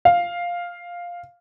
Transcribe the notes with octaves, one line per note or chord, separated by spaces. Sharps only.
F5